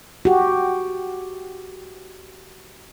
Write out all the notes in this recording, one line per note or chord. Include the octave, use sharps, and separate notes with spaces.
F#4 G4